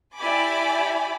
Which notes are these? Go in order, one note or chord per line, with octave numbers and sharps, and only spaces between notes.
E4 G4 D5 G#5 B5 D6